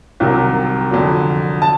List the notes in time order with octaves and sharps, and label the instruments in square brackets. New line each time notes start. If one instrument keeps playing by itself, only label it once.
[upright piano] C2 C3 D#3 F#3
F2 D3 F#3
A5